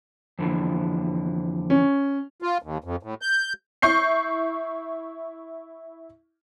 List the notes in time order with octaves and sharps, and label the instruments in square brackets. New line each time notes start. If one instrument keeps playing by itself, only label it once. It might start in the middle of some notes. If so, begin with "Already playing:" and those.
[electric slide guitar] F2 D3 E3
[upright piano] C#4
[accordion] F4
D#2
F2
A2
G6
[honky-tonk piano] E4 C#6 G6 C7